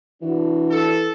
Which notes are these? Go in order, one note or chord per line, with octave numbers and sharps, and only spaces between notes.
E3 D4 F#4
A4